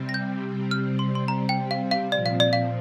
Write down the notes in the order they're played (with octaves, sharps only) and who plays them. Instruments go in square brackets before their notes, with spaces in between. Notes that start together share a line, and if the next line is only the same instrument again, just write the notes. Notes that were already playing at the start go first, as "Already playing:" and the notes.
Already playing: [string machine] C3 G3 C4
[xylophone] A#6
G6
F6
C6
C6
A#5
G5
F5
F5
[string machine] A#2 F3 C4 [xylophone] D5
[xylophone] F5
D5
F5